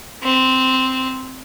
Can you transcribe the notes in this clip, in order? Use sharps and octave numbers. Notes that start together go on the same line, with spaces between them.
C4